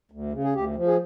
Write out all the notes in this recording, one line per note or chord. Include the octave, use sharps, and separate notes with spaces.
D2
C#3
G#4
D2 G4
F3
G#4